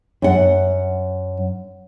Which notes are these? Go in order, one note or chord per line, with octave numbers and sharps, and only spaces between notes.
F#2 F#5